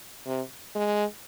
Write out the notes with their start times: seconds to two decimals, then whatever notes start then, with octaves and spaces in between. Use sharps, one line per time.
0.26 C3
0.75 G#3